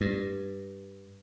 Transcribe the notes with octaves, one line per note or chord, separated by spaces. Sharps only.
G2